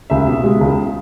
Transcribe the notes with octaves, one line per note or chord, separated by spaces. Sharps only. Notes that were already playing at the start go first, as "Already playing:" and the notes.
C#2 E5
B2
G#3
C#2